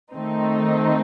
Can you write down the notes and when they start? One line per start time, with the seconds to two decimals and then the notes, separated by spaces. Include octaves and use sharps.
0.13 D#3 A3 C4 D#4